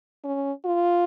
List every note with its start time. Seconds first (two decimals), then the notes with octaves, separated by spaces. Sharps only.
0.24 C#4
0.65 F4